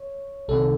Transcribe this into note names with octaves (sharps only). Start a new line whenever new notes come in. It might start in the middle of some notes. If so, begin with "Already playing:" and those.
Already playing: C#5
C2 C3 D#3 A4